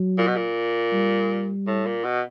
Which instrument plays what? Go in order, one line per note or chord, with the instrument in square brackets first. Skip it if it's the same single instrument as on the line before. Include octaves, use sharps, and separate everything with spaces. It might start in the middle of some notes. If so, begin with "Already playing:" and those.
Already playing: [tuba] F#3
[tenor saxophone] A#2
B2
A#2
[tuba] G3
[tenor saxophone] A2
A#2
B2